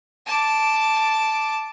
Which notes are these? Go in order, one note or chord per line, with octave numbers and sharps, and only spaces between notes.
A5 D6